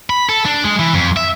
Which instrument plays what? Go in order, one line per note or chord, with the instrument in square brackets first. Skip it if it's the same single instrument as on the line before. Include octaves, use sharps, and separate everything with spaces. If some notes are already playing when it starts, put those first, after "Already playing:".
[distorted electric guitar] B5
A4
D4
G#3
E3
F2
E5